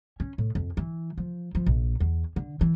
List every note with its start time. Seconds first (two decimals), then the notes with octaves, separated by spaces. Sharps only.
0.20 C#4
0.38 A2
0.55 F2
0.77 E3
1.18 F3
1.55 F3
1.66 A#1
2.00 E2
2.36 D3
2.61 E3